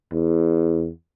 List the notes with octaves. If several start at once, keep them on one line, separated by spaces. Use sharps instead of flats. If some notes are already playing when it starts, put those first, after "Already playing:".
E2